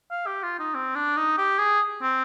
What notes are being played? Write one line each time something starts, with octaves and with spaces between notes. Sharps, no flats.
F5
G4
F4
D#4
C4
D4
D#4
G4
G#4
C4